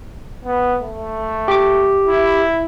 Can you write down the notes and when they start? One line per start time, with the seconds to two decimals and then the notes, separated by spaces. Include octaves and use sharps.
0.45 B3
0.82 A3
1.48 G4 D6
2.06 E4